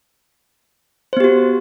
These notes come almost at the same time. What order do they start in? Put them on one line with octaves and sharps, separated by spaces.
C5 B3 G4 F#4